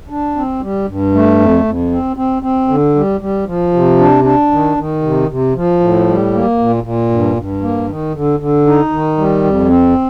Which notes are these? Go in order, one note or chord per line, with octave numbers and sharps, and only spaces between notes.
D4
C4
G3
G2
A3
F2
F2
C4
C4
C4
D3
G3
G3
F3
C3
D4
D4
D#3
D#3
C3
C3
F3
A2
G3
A#3
A#2
A#2
G2
G2
A#3
D#3
D3
D3
D#4
D#3
G3
F2
C4